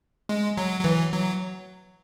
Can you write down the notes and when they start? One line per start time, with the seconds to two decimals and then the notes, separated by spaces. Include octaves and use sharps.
0.29 G#3
0.57 F#3
0.80 F#3
0.84 E3
1.12 F#3